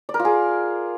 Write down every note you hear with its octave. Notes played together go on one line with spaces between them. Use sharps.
D5
A#4
F4
G#4